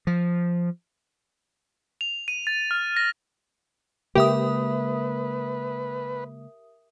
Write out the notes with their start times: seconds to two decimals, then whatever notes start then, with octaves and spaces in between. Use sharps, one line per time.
0.07 F3
2.01 F7
2.28 D#7
2.47 A6
2.71 F6
2.97 A#6
4.15 C#3 G#3 A#3 G4 A#4 B4 E5 D#6